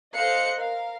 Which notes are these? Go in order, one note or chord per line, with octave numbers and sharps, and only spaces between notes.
A4 C5 D#5 F5 F#6 C#7
A#4 F5